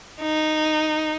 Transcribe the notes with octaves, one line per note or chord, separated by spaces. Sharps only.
D#4